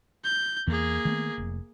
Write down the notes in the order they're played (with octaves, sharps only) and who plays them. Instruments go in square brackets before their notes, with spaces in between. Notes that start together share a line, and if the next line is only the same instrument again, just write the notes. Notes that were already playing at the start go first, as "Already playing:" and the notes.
[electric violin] G6
[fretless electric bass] E2 E3 [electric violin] A#3 G#4
[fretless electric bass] D#3 A3 B3
F1